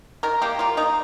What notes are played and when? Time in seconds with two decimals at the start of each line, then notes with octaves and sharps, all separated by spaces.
0.23 D#3 A#4
0.42 A#3 G4
0.59 A#3 F4
0.77 D#3 D#4